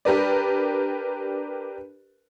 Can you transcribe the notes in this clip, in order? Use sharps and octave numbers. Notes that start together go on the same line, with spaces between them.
D4 G4 A#4 B4 D5